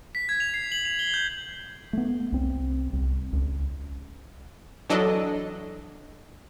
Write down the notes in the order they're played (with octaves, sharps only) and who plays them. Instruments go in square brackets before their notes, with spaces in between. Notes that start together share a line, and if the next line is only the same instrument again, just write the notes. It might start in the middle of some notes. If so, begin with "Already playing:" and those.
[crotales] B6
G#6
F7
C7
F#7
F7
G7
G6
[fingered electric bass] A3 B3
C2 C4
C2
C#2
[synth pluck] E3 F#3 D4 A4 D#5